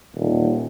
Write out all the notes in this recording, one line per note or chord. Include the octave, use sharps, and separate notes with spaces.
D#1